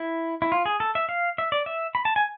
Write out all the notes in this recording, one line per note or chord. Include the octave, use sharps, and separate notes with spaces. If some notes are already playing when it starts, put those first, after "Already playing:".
Already playing: E4
E4
F4
G#4
A4
E5
F5
E5
D5
E5
B5
A5
G#5